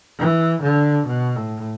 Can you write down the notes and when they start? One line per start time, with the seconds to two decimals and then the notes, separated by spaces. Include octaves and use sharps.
0.19 E3
0.63 D3
1.07 B2
1.36 A2